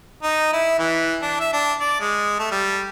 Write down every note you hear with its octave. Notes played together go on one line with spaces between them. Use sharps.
D#4
E4
E3
D4
E5
D4
D5
G#3
A3
G3